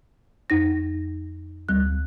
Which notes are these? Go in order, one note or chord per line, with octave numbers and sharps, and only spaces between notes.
F2 D#4 A#6
D2 G3 F#6